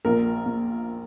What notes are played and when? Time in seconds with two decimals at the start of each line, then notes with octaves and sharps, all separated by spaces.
0.05 A#1 A#2 A#4
0.46 A#2